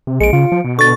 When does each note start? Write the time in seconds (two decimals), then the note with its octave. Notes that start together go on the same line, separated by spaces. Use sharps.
0.07 C3
0.21 A#1 G#3 C#7 D7
0.33 C#3 F4
0.52 F3
0.65 B2
0.79 D3 C#6 A6